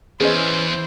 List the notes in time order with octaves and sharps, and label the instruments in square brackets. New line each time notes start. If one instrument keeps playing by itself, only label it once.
[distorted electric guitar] E2 [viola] E3 C5 [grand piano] B3 C#4 [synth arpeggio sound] G#4 D#5